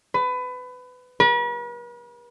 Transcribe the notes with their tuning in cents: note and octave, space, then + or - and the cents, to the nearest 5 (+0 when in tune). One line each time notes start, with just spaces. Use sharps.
B4 +25
B4 -45